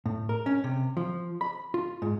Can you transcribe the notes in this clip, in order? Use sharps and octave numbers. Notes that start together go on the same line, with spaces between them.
A2
A#4
C#4
C3
F3
B5
F4
G#2